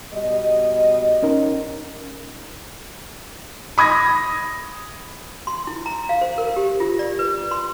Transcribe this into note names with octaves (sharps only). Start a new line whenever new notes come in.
B2 G3 D#5
C#4 D#4 A#4
B5 D#6 G#6 A#6
C6
E4
A#5
F5
C5
A#4
G4
F4
D5
B4
C6